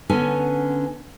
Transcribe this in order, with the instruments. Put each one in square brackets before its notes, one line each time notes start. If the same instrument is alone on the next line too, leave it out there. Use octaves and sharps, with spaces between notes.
[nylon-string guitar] D3 B3 C#4 G#5